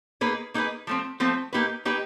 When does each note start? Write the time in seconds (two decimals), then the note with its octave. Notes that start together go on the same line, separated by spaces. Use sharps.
0.21 A#3 D#4 G#4 B4
0.54 A#3 D#4 G#4 B4
0.87 F3 A3 C4
1.20 F3 A3 C4
1.53 A#3 D#4 G4 B4
1.85 A#3 D#4 G4 B4